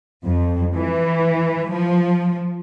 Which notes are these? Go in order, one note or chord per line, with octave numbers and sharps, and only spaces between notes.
F2
E3
F3